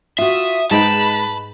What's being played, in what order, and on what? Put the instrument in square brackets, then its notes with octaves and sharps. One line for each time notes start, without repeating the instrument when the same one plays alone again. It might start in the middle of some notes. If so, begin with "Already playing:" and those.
[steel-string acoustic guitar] F4 F#4 [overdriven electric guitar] E5 [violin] D#6
[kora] G#2 D#4 G5 [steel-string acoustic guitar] G#3 [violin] B4 B5 [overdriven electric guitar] A5